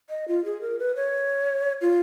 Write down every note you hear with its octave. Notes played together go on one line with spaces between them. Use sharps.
D#5
F4
G#4
A#4
B4
C#5
F4